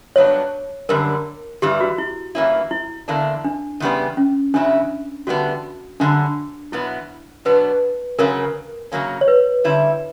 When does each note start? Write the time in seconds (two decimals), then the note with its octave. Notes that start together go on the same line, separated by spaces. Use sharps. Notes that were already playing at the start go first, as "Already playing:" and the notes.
0.16 G2 F#3 B3 D4 C#5
0.89 F#2 D3 G3 A#4
1.62 G2 E3 G3 G4
1.81 F#4
1.98 E4
2.35 G2 E3 A#3 C#4 E4
2.71 E4
3.08 E2 D3 A#3 D4
3.45 D4
3.80 E2 C#3 G3 B3
4.17 C#4
4.54 E2 C#3 F#3 C#4 D4 E4
5.27 E2 D3 G3 B3 D4 F#4
6.00 F#2 D3 G3 D4
6.72 E2 B2 F#3 B3 E4
7.45 B2 F#3 B3 D4 B4
8.18 C#3 F#3 C#4 A#4
8.92 C#3 F#3 A#3 C#4
9.21 C#5
9.28 B4
9.64 D3 G3 C#4 E4